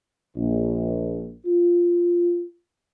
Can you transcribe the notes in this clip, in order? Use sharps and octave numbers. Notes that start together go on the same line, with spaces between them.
A#1
F4